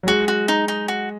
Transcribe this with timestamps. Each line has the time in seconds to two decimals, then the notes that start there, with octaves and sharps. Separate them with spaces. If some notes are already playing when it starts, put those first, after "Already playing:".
0.03 F#3
0.07 G#3 F#4
0.28 F#4
0.48 D#4
0.68 D#4
0.88 F#4